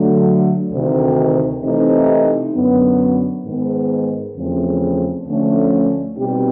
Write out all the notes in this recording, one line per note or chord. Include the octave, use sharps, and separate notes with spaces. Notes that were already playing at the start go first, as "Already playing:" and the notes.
Already playing: D3 F#3 A3
D2 C3 D#3
C3 E3 A3 C4 D#4
F#2 D3 F#3 B3
G#2 D#3 G#3 B3
E2 C#3 F3 A3 C4
D2 D3 F3 A3 C#4
B2 G3 C4 D#4 G4